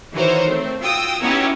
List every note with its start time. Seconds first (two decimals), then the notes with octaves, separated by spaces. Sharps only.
0.13 D#3 E3 F#4 A#4 C5 C#5
0.48 A3 C4
0.81 F4 F#4 G5 D#6 E6
1.20 B3 C#4 D#4 E4 F#4 G4